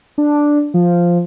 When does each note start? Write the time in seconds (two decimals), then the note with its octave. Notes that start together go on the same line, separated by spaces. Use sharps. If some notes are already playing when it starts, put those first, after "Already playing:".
0.18 D4
0.74 F3